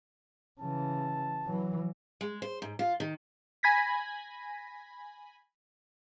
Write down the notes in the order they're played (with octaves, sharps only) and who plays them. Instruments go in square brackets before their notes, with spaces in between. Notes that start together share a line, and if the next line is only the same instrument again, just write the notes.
[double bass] C#3 E3 [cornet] A5
[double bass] E3 F#3
[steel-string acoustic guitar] G#3
C5
G#2
F4
D#3
[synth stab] G#5 B5 G#6 A#6 B6